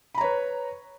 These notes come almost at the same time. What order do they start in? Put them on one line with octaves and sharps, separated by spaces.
B5 A#5 C#5 B4